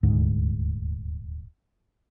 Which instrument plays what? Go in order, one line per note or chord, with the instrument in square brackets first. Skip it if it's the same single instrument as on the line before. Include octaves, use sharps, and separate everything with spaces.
[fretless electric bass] D#1 D2 G#2